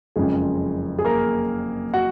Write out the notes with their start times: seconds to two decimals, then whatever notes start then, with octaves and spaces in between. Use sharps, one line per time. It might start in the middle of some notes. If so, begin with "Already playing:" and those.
0.16 F#1 F2 C#3 F3 G#3 G#4
0.99 G#4
1.05 A#3 A#4
1.94 F#4 F#5